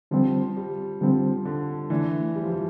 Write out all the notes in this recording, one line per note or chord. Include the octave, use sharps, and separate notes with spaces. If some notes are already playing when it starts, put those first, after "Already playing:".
D3 F3 G3 C4
G3
D3 F3 G3 C4
D3
D3 E3 A3 D4
G3
F3
E3